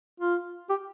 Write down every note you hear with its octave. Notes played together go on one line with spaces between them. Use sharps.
F4
G4